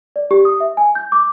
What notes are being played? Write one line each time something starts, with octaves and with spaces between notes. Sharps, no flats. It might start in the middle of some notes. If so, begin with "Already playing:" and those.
D5
G4
D#6
E5
G#5
G6
D6